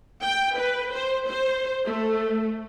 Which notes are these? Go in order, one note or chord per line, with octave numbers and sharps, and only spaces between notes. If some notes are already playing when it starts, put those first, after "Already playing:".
G5
B4
C5
C5
A3